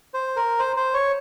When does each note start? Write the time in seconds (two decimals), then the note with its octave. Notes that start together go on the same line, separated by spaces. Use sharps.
0.14 C5
0.36 A#4
0.59 C5
0.76 C5
0.94 C#5